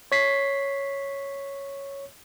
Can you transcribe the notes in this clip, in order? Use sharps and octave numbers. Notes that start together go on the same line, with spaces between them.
C#5 B6 C7